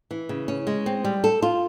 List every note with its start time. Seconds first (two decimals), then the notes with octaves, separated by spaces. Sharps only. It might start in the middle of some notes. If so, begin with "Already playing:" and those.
0.11 E3
0.29 C#3
0.48 C#4
0.67 G#3
0.86 C4
1.04 G3
1.24 A4
1.42 F4